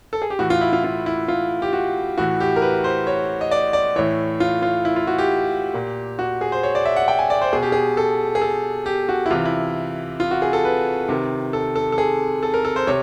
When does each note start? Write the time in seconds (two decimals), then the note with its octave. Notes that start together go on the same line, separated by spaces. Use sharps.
0.13 A4
0.22 G#4
0.30 G4
0.39 A2 E3 F#4
0.50 F4
0.61 E4
0.73 F4
0.84 F4
1.06 E4
1.28 F4
1.62 G4
1.73 F#4
2.18 A2 E3 F#4
2.40 G4
2.56 A#4
2.62 B4
2.84 C5
3.07 C#5
3.41 D#5
3.51 D5
3.73 D5
3.96 A2 E3 C#5
4.40 F4
4.62 F4
4.85 E4
4.96 F4
5.07 F#4
5.18 G4
5.74 A#2
6.19 F#4
6.41 G#4
6.52 C5
6.63 C#5
6.75 D5
6.85 E5
6.96 F#5
7.08 G5
7.19 G#5
7.30 D5
7.41 C5
7.53 B2 G#4
7.63 G4
7.72 G#4
7.97 A4
8.35 G#4
8.42 A4
8.86 G4
9.09 F#4
9.26 E4
9.30 C3 E3 F4
9.46 E4
10.20 F4
10.31 F#4
10.42 G#4
10.53 A4
10.65 B4
11.09 C3 D#3
11.53 A4
11.76 A4
11.92 A4
11.98 G#4
12.43 A4
12.54 A#4
12.65 A4
12.76 C5
12.87 C3 C#5